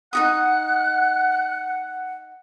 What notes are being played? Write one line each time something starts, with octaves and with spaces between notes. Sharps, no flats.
D#4 F#4 F#5 D#6 F#6